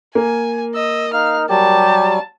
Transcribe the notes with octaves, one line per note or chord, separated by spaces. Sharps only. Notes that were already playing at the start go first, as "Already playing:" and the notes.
A#3 G#5
D#5 E6
D#4 F5 F6
F#3 G3 G4 A5